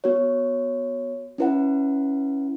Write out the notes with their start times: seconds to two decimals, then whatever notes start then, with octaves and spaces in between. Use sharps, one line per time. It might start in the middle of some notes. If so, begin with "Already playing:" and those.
0.04 B3 F#4 C#5
1.38 C#4 E4 B4 F#5